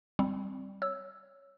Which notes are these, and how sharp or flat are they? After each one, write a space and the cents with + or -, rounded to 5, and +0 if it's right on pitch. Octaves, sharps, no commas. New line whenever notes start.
G3 +0 C4 +0
C#5 +0 E6 +0